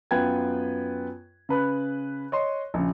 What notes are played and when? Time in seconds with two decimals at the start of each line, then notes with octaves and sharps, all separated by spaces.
0.11 F#2 B3 F4 B4 G5 G#6
1.49 C#3 B4 B5 F#6
2.32 C#5 D#5 C6
2.74 A#1 C#3